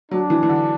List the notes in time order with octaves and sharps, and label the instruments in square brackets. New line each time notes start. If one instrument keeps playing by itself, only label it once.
[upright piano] F#3 [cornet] D4
[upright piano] E3
E3
D3